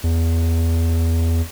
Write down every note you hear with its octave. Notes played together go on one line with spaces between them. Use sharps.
E2